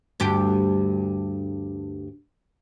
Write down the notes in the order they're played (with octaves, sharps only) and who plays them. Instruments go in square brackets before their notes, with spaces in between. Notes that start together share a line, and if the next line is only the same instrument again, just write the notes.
[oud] D2 G2 G4